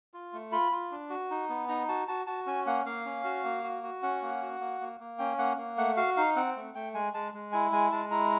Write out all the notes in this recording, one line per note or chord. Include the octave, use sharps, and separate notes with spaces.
F4
A3
F4 B5
F4
D4
F#4
D#4
B3
D#4 A#5
F#4 A5
F#4 A5
F#4 A5
C#4 G#5
A#3 F#5
A#3 F5
C#4
F#4
A#3
F#4
F#4
C#4 F#5
A#3
F#4
A#3
A#3
A#3
C#4 G5
A#3 F#5
A#3
A3 F#5
F#4 F5
D#4 F5
C4 F#5
A3
A3 G5
G#3 G#5
G#3 A5
G#3
E4 G#5
G#3 G#5
G#3 A5
E4 A#5